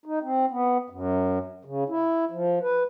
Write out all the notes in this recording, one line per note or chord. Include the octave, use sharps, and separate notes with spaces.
D#4
C4
B3
F#2
C#3
E4
F3
B4